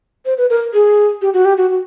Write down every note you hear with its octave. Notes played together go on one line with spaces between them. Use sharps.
C5
B4
A#4
G#4
G4
F#4
G4
F#4
F#4